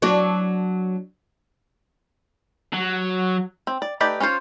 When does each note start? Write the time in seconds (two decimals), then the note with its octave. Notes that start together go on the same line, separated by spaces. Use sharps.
0.02 F#3 D4
2.73 F#3
3.67 C4
3.82 D5
4.00 A3 D#4 G4 B4 D5
4.20 C#4 D4 F4 C5 C#5